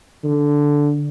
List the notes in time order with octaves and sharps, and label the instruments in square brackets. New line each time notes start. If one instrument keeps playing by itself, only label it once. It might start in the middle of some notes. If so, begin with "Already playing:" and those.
[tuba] D3